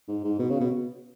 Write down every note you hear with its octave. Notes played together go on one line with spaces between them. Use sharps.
G#2
G#2
B2
C#3
B2